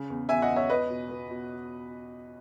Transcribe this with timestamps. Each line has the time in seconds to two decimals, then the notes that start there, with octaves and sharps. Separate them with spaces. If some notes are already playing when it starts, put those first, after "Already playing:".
Already playing: C#3
0.10 E2
0.29 E2 E5 G#5
0.42 D#5 F#5
0.49 E2
0.56 C#5 E5
0.69 E2 B4 D#5
0.89 B2
1.09 B3
1.30 B2